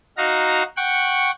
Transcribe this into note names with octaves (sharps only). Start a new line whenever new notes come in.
D#4 F#4 F5 A#5
F#5 G5 C#6 F#6